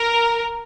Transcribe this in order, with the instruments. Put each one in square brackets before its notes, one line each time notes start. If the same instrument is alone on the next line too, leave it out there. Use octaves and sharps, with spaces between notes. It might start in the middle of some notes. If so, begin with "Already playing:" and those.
Already playing: [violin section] A#4